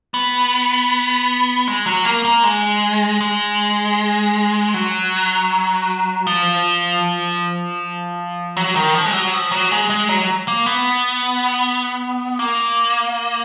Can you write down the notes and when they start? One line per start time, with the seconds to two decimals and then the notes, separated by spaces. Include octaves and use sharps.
0.14 B3
1.68 G#3
1.86 F#3
2.05 A#3
2.25 A#3
2.44 G#3
3.21 G#3
4.74 F#3
6.27 F3
8.57 F#3
8.76 D#3
8.94 F3
9.06 G#3
9.13 F#3
9.33 F3
9.51 F#3
9.71 G#3
9.90 G#3
10.09 F#3
10.48 A#3
10.66 B3
12.39 A#3